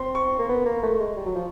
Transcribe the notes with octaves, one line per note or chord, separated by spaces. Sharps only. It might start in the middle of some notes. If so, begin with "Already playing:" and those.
Already playing: C4 C6
C#6
A#3
B3
A#3
A3
G#3
G3
F#3
F3